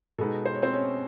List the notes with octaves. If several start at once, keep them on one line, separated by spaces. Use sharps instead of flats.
B2 G#3 B3 D#4 A4
C5
C#5
C4 C5
C#4 C#5